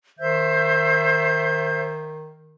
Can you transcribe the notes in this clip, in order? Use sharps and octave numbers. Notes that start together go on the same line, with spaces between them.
D#3 C5 E5 G6